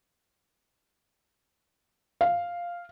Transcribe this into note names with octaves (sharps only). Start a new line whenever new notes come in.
F5